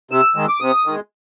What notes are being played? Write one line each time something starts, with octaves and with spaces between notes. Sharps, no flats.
C3 E6
D#3 G#3
D6
C3 D#6
D#3 G#3